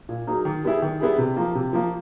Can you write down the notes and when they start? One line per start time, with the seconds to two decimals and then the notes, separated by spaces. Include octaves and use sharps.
0.09 A#2
0.27 F#3 A#3 D#4 G#4
0.45 D#3
0.64 G3 B3 E4 G#4
0.82 D#3
1.00 G3 B3 E4 G#4
1.18 C3
1.36 F3 A#3
1.55 C3
1.73 F3 A#3